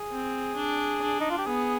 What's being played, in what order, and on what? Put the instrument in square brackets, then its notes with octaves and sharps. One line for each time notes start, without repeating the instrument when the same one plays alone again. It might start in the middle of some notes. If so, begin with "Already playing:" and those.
Already playing: [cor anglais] G#4
[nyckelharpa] C4
D4
D4
[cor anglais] D#4
F4
G4
[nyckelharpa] B3 [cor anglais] G#4